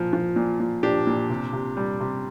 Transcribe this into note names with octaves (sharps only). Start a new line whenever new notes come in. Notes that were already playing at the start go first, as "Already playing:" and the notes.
Already playing: A#2 F3
F3
A#2
A#2
F3 D4 G4
A#2
C3
C3
G3
C3